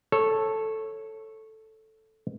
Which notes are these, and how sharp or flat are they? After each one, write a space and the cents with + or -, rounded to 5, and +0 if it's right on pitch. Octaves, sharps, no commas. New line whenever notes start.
A4 +0 C#5 -15